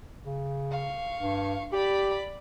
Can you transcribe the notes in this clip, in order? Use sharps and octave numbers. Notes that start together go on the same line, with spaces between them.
C#3
F5 C#6
G2
G4 D5 B5